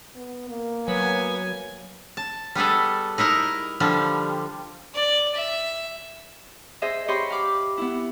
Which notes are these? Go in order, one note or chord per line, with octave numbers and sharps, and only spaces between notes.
B3
A#3
F#3 B3 G#5
A5
G3 B3 G#4 A4
D#4 E4 A#4 D#5
D3 F3 G3
D5
E5
G#4 C5 D#5 E5
G4 C5 C#5 D#5 B5 C6
F5 B5 D6
B3 E4